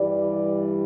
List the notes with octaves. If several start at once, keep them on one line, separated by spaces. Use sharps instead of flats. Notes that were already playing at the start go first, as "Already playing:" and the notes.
Already playing: G2 E3 G3 D5